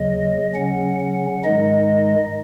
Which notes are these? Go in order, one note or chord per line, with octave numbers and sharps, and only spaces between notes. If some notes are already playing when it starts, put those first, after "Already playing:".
Already playing: D#2 C#3 F#3 D#5
C#3 F#3 C#4 F#5
F#5
G#2 D#3 G#3 D#4 D#5